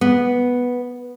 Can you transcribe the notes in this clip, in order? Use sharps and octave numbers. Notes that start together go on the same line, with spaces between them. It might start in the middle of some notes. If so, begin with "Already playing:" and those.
B3